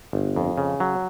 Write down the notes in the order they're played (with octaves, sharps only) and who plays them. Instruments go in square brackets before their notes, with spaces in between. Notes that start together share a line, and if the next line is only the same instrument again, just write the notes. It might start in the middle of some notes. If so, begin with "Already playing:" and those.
[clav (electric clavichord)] G1
F2
C#3
F#3